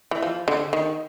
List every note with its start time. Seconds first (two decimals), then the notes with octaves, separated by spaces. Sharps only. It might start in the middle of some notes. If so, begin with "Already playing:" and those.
0.11 E3
0.22 F3
0.48 D3
0.73 D#3